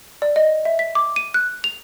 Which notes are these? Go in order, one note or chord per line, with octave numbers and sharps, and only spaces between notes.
D5
D#5
E5
B6
D6
D#7
F#6
F7